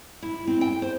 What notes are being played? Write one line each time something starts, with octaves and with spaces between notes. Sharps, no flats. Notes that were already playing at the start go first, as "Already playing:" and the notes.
E4
C4
G5
C5